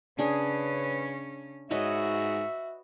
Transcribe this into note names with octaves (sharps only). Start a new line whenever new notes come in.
C#3 C#4 D4 G#4 B4
G#2 F#4 B4 C#5 D#5 E5